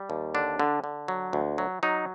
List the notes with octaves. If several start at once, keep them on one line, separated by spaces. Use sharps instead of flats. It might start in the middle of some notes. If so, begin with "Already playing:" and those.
Already playing: G3
D#2
D3 D4
D3
D3
F#3
D2
F#3
F#3 D#4